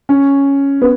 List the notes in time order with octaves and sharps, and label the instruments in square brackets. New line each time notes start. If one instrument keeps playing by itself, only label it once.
[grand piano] C#4
B3